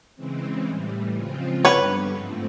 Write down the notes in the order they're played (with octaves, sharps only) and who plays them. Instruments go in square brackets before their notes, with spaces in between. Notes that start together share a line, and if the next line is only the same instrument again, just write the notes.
[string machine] C#3 E3 G#3 C4
A2 E3 G3
C#3 F3 G#3 C4 F4
[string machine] G2 D3 G3 B3 [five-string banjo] B4 C#5
[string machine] G#2 F3 A3 C4